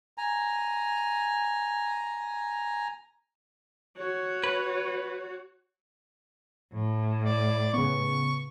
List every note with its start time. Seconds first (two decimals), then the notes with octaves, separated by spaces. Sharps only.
0.18 G#5 A#5
3.97 F#4 C#5
4.44 B4
6.73 A2
7.24 D5
7.74 C#3 B3 C#6